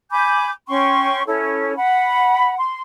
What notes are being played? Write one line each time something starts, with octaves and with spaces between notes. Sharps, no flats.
G#5 B5 D6 G6
C#4 G5 C6 C#6
C#4 E4 A4 C#5
F#5 B5
C6